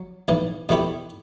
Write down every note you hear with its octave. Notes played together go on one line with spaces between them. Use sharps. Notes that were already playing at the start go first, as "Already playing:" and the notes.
Already playing: F#3
B1 A2 E3
E2 B2 A3 E4 G4